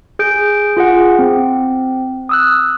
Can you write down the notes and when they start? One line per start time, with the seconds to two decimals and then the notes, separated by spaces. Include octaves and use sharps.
0.19 G#4 G6 D7
0.77 F4 G#4 F#5
1.19 C4
2.29 D#6 E6 F#6